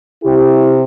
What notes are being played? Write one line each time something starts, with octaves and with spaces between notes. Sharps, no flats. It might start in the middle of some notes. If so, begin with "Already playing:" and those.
C3 E4 G4